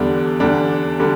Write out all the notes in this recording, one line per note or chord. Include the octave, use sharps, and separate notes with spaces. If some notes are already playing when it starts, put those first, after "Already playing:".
Already playing: E2 D3 G3 D4
E2 D3 G3 D4
D3 G3 D4